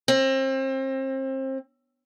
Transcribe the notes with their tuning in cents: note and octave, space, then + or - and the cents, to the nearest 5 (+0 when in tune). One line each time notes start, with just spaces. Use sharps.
C4 +30